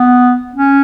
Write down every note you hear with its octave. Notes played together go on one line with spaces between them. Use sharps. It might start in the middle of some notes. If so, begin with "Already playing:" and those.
Already playing: B3
C#4